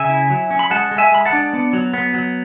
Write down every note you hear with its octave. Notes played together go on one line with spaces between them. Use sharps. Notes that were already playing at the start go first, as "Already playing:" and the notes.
Already playing: C#3 E5 G#5
E4
F#3
C#4
B5
G#3 F#5 A5
G#3
E5 G#5
G#3 B5
F#5 A5
D4
B3
F#3
B3
F#3